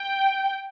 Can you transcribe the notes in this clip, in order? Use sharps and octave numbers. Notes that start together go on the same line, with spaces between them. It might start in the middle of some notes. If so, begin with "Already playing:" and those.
Already playing: G5